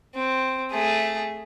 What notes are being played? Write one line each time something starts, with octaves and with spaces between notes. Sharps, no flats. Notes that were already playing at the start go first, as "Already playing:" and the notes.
C4
A3 G#4